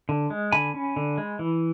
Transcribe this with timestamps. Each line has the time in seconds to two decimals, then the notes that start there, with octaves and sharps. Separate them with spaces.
0.09 D3
0.30 G#3
0.52 D3 G#5 B5
0.74 C#4
0.96 D3
1.18 G#3
1.39 E3